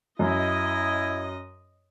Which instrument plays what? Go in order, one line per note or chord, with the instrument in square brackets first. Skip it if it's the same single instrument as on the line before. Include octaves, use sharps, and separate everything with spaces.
[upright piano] F#2 [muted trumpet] E4 [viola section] D#5